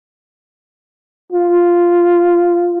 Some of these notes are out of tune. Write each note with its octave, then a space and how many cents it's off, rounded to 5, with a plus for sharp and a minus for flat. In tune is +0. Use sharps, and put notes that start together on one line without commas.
F4 -5